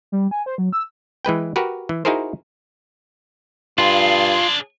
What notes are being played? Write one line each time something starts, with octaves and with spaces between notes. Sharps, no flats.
G3
G#5
C5
F#3
E6
E3 G#3 B4 G5
F#4 G4 A#4 B4
E3
D#4 E4 F#4 G#4 A#4 C5
G2 D4 F4 G#4 C6